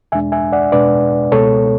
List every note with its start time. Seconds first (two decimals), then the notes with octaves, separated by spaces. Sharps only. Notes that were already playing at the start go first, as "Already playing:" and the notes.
0.12 E2 B2 G#3 D4 E5 G#5
0.32 E5 G#5
0.52 D5 F#5
0.72 E2 B2 G#3 D4 B4 D5
1.32 C#2 B2 G#3 B3 A4 C#5